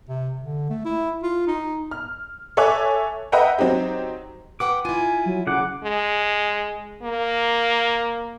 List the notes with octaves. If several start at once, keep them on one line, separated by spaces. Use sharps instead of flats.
C3
D3
A3
E4
F4
D#4
F6
A4 C#5 E5 G#5 D6 F#6
B4 D#5 E5 F#5 G5 A#5
F#3 C4 D#4 G4
B4 F#5 G5 D6
E4 F4 G#5
F#3
C#3 F#5 D6
G#3
A#3